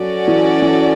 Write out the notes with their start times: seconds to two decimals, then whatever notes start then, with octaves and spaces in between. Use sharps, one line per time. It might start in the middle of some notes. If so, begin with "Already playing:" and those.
Already playing: F#3 C#4 F#4 A4 D5
0.27 E3
0.62 E3